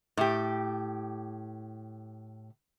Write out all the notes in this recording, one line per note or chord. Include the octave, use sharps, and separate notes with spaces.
A2 G4